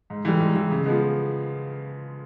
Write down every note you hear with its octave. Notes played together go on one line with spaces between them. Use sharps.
G#2
E3 G3
G#2
E3 G3
C#3
F3 G#3 B3